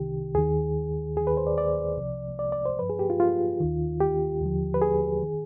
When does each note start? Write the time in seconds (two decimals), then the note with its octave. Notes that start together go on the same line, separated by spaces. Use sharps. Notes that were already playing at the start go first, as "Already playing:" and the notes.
Already playing: C2 C3 D#3 G4
0.35 D#2 D#3 G#4
1.16 D#2 D#3 G#4
1.27 B4
1.37 C5
1.47 D5
1.58 D5
1.97 C2 C3 F3
2.39 D5
2.52 D5
2.65 C5
2.79 G2 F3 B4
2.89 G#4
2.99 G4
3.10 F4
3.20 F4
3.60 D#2 D#3
4.00 G4
4.41 D#2 D3 F3
4.74 B4
4.82 G#4
5.23 D#3